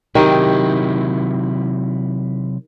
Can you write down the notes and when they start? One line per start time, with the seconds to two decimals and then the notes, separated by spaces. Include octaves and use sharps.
0.15 C3 D#3 F#3 E4 G4